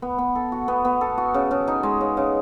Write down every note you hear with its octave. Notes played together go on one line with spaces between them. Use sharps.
B3
B3
A4
F#4
B3
B3
A4
F#4
C#3
C#3
D#4
G#3
C#3
C#3